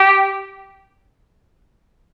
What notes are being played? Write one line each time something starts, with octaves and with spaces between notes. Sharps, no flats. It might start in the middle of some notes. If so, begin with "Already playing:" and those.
Already playing: G4